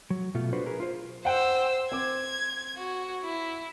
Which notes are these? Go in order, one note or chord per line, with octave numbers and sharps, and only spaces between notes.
F#3
B2 A3 F4
D4 F#4 B4 C5
G#4 A#4 B4
F4 C5
C5 F#5 G5 E6
C4 D6 G#6
F#4
E4